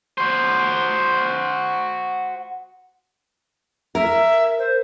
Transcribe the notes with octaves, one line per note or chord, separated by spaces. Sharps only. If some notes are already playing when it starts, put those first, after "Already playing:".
F#4 C5
A#4 E5
C5